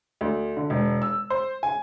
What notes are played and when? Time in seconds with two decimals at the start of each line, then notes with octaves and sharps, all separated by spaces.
0.21 D2
0.57 D3
0.70 E1
1.02 E6
1.30 C5
1.63 G#5